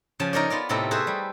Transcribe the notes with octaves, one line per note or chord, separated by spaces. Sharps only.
C#3 F3 G#5 A5
D#4 A#4 C#5 D5
B3 F4 D5
A2 C3 B3 C4 D#4 A4
F#4 G#4 A4 B4 C5 E5
G3